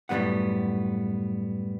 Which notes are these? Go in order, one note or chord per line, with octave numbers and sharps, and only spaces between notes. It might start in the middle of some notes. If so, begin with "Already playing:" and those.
F#2 A2 F3 G3 B3 F#5